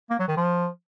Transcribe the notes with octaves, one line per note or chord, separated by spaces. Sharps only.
A#3
F#3
D#3
F3